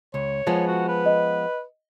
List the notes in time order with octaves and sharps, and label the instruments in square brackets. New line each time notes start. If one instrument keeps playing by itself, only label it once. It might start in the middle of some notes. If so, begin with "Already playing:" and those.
[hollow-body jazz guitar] C#2 [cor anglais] C#5
[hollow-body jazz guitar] F3 G#3 B3
[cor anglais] F#4
B4
[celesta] D#5